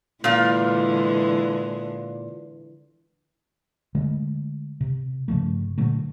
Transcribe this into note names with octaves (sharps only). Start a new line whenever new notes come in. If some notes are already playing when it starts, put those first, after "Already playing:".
A#2 D3 E3 G#3 F4
D3 G#3 A3
C3
G2 C#3 F3 A3
A#2 D3 F#3 A3